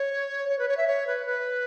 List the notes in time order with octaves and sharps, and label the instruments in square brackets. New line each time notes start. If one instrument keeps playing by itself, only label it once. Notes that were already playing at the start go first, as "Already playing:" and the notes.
Already playing: [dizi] C#5
C#5
B4
C#5
E5
C#5
B4
B4